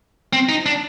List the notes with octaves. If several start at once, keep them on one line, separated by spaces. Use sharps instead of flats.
C4
D#4
D4